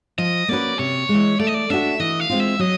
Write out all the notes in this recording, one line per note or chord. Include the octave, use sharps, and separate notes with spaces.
F3 D#5
A#3 C#4 F#4 B4 D5
C3 C#5
G#3
E3
A3 D5
D#5
D5
D4 F#4 E5
E3 D#5
F5
G#3 C4 F4
E5
F#3 D#5